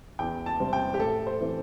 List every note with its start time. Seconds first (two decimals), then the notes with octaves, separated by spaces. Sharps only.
0.19 E2 G5
0.46 A5
0.60 C3 G3 C4
0.73 G5
0.94 G4
1.00 A2 A4
1.27 C5
1.41 E3 C4